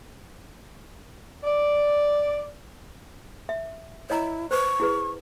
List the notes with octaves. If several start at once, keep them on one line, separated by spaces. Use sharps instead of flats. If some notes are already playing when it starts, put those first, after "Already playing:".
D5
E5
E4 C#5 D#5 A#5
B4 C5 C#6
E4 G#4 B4